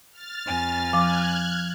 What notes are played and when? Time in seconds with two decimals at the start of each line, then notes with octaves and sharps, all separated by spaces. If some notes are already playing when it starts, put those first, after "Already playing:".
0.12 F6 A6
0.45 F2 G#5
0.93 F3 D6 F6 F#6 G#6